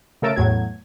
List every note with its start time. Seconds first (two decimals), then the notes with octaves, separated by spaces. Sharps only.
0.22 C#3 A3 A#4 E6 A6 D7
0.36 E2 A2 F#3 G#6